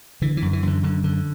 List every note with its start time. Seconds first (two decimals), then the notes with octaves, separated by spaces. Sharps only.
0.22 D3 E3
0.37 E3
0.42 F#2
0.53 E3
0.63 F#2 D3
0.83 F#2 D3
1.04 D3